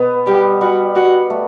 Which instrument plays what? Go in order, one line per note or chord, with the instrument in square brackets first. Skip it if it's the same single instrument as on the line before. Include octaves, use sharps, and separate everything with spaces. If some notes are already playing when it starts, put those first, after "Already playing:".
Already playing: [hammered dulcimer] B2 B3
[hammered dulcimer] G3 [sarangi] G4
[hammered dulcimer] G3 [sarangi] F#4
[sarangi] F#4 [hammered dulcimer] G4
[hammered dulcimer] A3